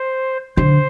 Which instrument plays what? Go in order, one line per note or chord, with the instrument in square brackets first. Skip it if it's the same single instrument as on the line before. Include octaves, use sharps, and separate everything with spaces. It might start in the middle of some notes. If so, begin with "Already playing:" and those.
Already playing: [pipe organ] C5
[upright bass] D3 [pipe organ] C5